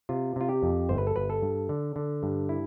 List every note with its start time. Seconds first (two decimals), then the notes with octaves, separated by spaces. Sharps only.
0.09 C3 F4
0.36 C3 F4
0.49 G4
0.63 F2
0.89 G1 C5
0.98 B4
1.07 A4
1.16 G1 B4
1.30 A4
1.42 G2
1.69 D3
1.96 D3
2.23 G2
2.49 E4